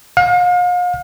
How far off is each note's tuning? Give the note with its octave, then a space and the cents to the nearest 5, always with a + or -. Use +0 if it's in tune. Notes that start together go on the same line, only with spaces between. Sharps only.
F5 +40